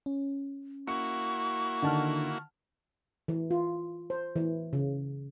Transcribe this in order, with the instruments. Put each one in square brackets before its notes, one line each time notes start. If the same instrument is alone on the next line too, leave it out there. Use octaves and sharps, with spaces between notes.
[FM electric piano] C#4
[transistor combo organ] A#3 E4 F#4 [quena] C#6 [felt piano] C#7
[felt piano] D3 D#3 [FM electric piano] F#5 A5 F6
[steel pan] E3
F4
C5
E3
C#3